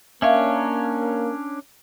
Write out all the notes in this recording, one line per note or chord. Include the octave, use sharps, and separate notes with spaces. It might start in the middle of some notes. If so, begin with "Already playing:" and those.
A#3 C#4 D4 C#5 E5 F5